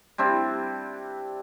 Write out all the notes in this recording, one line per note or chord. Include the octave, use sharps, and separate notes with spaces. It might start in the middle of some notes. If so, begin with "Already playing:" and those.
G3 C4 D4 E4